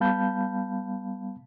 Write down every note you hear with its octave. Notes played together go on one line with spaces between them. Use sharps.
G3 B3 F5 A5 B5 G6